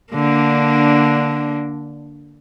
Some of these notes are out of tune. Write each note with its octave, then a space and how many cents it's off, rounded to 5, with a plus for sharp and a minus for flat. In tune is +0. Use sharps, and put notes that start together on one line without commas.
D3 +0 A#3 +0 D4 -10